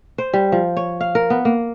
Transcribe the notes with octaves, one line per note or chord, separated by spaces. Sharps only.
C5
G3
F3
C#5
F5
A#4
B3
A#3